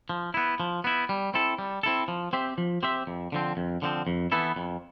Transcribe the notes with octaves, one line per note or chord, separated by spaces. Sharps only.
F3
B3 E4
F3
B3 E4
G3
C4 E4 A4
G3
C4 E4 A4
F3
C4 G4 C5 E5
F3
C4 G4 C5 E5
F2
D3 F3 C4
F2
D3 F3 C4
F2
E3 B3 E4 A4
F2